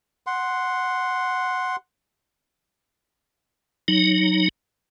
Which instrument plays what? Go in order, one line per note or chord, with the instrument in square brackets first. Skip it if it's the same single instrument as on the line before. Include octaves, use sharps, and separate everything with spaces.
[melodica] F#5 C6
[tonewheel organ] F#3 D#4